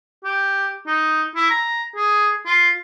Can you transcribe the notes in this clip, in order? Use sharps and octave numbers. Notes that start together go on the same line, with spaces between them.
G4
D#4
E4
A#5
G#4
F4